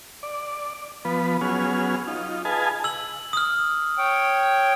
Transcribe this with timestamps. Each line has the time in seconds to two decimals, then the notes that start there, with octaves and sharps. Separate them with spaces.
0.23 D5
1.05 F3 B3 B4
1.41 F#3 B3 C#4 G#4 F6
2.07 D#4 F4
2.45 G#4 B4 D#5 F5 G#5 A5
2.84 E6 F#7
3.33 D#6 F6
3.98 C#5 G5